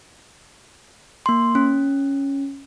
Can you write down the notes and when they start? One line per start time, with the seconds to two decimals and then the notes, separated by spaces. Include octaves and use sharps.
1.26 A#3 C6
1.55 C#4